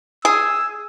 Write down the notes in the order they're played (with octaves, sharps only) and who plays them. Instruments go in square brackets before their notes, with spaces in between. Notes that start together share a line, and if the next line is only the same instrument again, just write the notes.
[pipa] G#4 [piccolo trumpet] E6